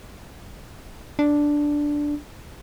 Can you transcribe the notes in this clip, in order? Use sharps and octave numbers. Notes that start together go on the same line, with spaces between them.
D4